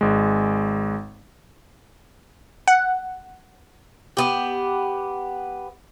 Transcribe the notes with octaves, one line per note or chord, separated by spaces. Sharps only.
G#1 G#3
F#5
B3 G4